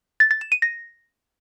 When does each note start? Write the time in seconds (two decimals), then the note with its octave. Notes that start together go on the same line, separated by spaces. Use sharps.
0.20 A6
0.31 A6
0.41 E7
0.52 D#7
0.62 A#6